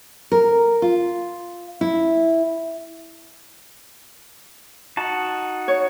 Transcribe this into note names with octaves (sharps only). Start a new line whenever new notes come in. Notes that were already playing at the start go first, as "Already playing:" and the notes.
A#4
F4
E4
D#4 F#4 A5
C#5